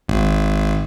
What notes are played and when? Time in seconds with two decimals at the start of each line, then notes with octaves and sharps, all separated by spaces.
0.09 G#1